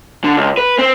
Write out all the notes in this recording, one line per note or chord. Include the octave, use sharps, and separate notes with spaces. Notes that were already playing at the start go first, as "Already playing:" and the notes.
D3
C#2
B4
C4